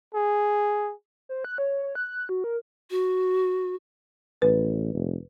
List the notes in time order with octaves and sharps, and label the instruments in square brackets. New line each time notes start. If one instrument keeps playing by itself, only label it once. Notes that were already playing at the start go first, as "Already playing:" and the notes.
[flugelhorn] G#4
[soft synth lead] C5
F#6
C#5
C#5
F#6
F#4
A#4
[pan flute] F#4
[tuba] A1 [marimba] B4
[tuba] F1